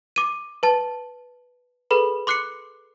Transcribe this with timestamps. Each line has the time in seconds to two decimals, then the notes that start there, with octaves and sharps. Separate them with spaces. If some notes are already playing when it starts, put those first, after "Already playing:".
0.16 D6 D#7
0.63 B4 A5 A6
1.91 G#4 A4 B4 B5
2.27 C6 D6 F#6 C7 C#7